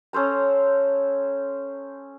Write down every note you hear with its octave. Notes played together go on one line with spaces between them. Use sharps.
C#4 A4 C5 A#5